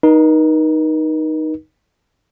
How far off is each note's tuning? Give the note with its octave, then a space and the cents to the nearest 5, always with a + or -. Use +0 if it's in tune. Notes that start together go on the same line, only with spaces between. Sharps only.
D#4 +0 A#4 +45